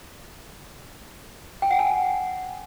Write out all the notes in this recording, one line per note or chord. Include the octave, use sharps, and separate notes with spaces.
G5
F#5
G#5